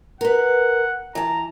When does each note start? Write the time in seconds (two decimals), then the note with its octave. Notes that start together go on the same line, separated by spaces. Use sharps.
0.21 A#4 B4 F#5
1.15 E3 A5 A#5